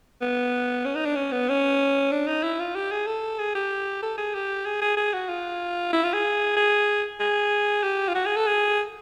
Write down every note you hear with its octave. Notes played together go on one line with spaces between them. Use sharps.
B3
C#4
D#4
D4
C#4
B3
C#4
D4
D#4
E4
F4
G4
G#4
A4
G#4
G4
A4
G#4
G4
G#4
G#4
G#4
F#4
F4
E4
F4
G#4
G#4
G#4
G4
F4
F#4
G#4
A4
G#4